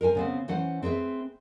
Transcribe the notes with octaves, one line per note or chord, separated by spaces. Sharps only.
A#4 C5 G5 G#5
C#3 B3 C4
E3 C#4 C5 F#5
C4 G#4 B4 E5